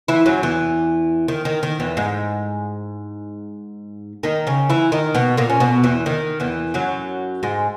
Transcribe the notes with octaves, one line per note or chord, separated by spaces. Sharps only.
E3 E4
F#2 F#3
E2 E3
D#3
D#3
D#3
E2 E3
G#2 G#3
D#3 D#4
C#3 C#4
E3 E4
D#3 D#4
B2 B3
A#2 A#3
C#4
B2 B3
E2 E3
D#3
E2 E3
F#2 F#3
G#2 G#3